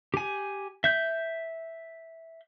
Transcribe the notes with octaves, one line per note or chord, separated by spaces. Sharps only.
G4 G#5
E5 G6